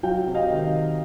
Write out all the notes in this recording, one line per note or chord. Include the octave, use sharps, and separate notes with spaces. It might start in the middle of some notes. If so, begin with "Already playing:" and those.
F#3 F5 G5
C3
D#5 F5
D#3